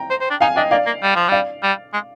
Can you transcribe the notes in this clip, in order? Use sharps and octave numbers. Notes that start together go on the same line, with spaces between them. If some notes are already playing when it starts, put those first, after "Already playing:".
Already playing: G5 A#5
C5
C5
D4
D#4 F5 G#5
D4 D#5 G5
A#3 D5 F5
A#3
G3
F3
G3 D5 F5
G3
G#3